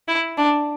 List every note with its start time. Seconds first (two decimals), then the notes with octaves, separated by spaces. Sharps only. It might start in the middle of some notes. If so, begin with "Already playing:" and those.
0.08 E4
0.37 D4